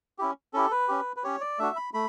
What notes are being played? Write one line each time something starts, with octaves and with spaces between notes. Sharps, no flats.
C#4 E4 G4
C#4 E4 G4 A4
B4
C#4 G4
B4
C#4 G4 C#5
D5
A3 D4 F#4 E5
B5
A3 B5